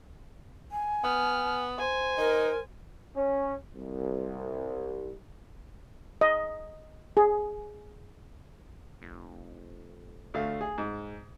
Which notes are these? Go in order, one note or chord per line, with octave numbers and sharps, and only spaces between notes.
G#5
B3 F6
C5 G#5
D#4 A#4
C#4
C2
D#5
G#4
F1
D2 A3 F5
G#4
G#2